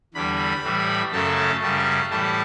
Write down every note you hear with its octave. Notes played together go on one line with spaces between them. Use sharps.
E2 D3 G3 B5
A2 E3 G3
F#2 C#3 F#3 A3 A5
F#2 C#3 G3 A5
A2 E3 G3 A5